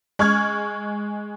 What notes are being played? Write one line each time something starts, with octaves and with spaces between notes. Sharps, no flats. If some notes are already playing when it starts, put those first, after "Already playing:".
G#3 C#6 F6 G#6